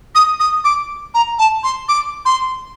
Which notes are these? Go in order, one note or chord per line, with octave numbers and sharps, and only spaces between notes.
D#6
D#6
D6
A#5
A5
C6
D6
C6